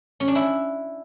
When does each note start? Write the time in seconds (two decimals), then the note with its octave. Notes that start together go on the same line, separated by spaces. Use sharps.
0.20 C#4
0.28 D4
0.35 E4